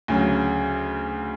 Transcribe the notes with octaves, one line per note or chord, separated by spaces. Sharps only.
D2 C#3 F#3